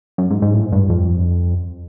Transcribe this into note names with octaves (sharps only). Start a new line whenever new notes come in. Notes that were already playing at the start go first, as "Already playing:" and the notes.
F#2
G#2
G#2
A2
G#2
G2
F2